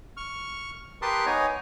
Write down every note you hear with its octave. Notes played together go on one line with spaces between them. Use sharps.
C#6 F6
G4 A#4 B4 A5 C6 D#6
B3 D#4 C#5 G#5 A#5